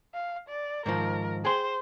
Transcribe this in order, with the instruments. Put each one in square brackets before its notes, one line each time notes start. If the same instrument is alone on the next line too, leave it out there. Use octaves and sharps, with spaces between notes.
[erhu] F5
D5
[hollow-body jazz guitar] G#2 D#3 F3 [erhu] A#4
[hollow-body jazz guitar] G#4 G5 C6 [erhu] C5